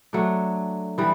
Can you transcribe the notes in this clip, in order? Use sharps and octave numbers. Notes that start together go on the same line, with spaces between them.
F#3 A3 D4
E3 G3 B3